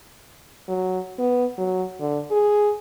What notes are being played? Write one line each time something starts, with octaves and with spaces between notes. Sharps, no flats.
F#3
B3
F#3
D3
G#4